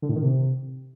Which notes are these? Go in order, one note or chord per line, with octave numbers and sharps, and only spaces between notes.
D3
A2
D#3
C3